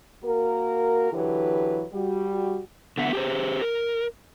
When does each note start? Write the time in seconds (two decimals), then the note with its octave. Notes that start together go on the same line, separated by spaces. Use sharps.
0.24 A#3 F#4 A#4
1.13 D3 E3 F#3 G4 B4
1.93 G3 F#4
2.98 D3 B3 E5 F#5
3.13 G4 G#4 C5
3.62 A#4